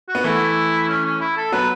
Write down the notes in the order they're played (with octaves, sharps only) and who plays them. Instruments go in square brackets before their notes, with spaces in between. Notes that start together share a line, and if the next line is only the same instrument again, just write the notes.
[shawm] F#4
[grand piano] B3
[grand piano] E3 A3 [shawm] E4
[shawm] C#4
C#4
E4
A4
[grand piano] F#3 B3 [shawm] B4